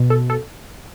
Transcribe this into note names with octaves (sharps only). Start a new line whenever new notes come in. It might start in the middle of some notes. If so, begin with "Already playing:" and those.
Already playing: B2
A4
A4